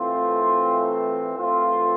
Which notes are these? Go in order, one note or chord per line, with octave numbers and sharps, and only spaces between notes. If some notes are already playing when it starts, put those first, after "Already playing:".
Already playing: E3 A3 C4 F4
E3 A3 C4 F4